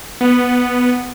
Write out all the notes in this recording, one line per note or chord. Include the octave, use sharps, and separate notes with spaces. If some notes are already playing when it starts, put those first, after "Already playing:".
B3